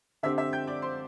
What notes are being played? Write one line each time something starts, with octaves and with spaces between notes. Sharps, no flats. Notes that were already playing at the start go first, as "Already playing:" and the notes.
D3 C4 G4 E5 E6
E5 E6
G5 G6
D5 D6
C5 C6